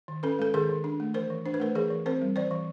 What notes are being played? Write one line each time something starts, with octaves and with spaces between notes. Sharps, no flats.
D#3
C#4 A4 B4
G#3 A4
D#3 G#4 A#4
D#3
D4
A3
E3 A#4 C5
E3
D4 C5
B4
A3 A#4 C5
E3 G#4 A#4
E3
C4 A#4 C5
G3
E3 C5 D5
E3